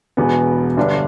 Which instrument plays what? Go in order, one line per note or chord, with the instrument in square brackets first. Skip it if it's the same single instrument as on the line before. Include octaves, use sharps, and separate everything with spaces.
[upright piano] E1 E2 B2 B3
G1 G2 D3 G3 D4